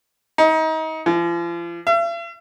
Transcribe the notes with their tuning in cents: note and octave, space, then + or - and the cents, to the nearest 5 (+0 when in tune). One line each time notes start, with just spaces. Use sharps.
D#4 +30
F3 -40
E5 +45